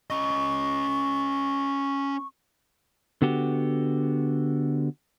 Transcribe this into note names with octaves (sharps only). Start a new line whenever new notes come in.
C#4 D#5 C#6
D3 B3 F#4 G4